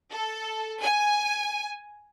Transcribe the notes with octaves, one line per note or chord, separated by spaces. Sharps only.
A4
G#5